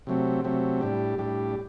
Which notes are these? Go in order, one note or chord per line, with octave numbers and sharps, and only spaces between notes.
C3 F#3 A3 C4
C3 F#3 A3 C4
A2 G3 D4 G4
A2 G3 D4 G4